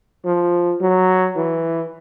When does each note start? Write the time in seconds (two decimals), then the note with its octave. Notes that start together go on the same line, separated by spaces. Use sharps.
0.25 F3
0.81 F#3
1.36 E3